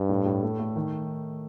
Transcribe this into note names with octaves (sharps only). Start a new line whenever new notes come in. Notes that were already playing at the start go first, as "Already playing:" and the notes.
Already playing: G2
A2
A2
A3
A3
D#3